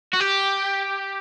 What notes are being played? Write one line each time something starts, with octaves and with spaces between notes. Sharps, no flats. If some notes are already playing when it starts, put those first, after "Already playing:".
F#4
G4